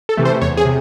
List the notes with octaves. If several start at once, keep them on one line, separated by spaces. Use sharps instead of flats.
A4
C3 E3 A3
C5
E2 C#5
G#4
C3